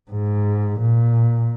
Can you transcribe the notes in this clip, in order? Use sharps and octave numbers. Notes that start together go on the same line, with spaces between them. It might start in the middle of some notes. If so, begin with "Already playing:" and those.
G#2
A#2